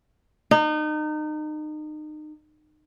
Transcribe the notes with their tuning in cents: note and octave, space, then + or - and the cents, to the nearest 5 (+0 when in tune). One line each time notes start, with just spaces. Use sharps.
D#4 -30